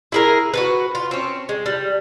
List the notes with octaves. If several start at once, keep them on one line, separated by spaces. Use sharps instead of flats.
E4 G#4 A#4
F#4 A4 B4
F4
C4 C#4
G#3
G3